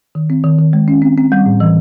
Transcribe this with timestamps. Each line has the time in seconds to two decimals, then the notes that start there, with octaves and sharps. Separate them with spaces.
0.15 D#3
0.30 C4
0.44 D#3
0.59 D#3
0.73 G#3
0.88 C#4
1.02 C4
1.17 C4
1.32 G3
1.46 A2
1.60 E3